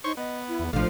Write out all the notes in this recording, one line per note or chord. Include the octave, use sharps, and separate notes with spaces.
D#4 C5 C#5 C#6
B3 D#5
E4
E2
A1 F3 A3 D4 F5